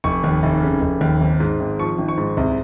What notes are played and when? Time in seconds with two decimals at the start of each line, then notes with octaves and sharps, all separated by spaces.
0.04 F1 C#6
0.24 D#2
0.43 F1
0.62 C#3
0.81 F1
1.01 D#2
1.21 G#1
1.40 G#2
1.60 G#1
1.79 F3 C#6
1.98 G#1
2.08 C#6
2.18 G#2
2.37 C2